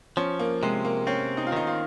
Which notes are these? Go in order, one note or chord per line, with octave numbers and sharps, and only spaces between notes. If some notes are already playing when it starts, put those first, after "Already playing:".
F3 C#4
A#3
C3 G#3
A#3
C4 C#4
D#4
F4
D#3 D#4
F4